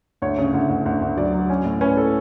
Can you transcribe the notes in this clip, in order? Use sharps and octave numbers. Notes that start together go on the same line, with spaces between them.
D2 C#5
C#3
D2
D2
D2
D2
F#3 D5
F#3
C#4
A2
C#4 B4
A4